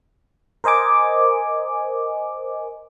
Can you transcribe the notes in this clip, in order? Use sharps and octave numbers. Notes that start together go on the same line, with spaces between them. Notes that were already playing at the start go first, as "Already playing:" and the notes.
A#4 C5 D#5 G#5 D6